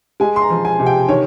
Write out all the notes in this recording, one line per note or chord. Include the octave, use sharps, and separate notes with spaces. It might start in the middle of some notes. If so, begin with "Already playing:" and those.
G#3 G#5
C6
A#5
F3
G#5
C3
G5
D#3 C#5